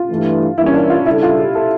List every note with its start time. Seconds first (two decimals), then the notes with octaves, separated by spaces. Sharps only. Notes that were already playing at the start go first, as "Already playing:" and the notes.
Already playing: F4
0.10 G2 E3 A3
0.58 G2 E3 A#3 E4
0.66 C#4
0.74 D4
0.90 F4
1.06 C#3 G3 D4 E4 A4
1.23 F4
1.39 G4
1.55 A4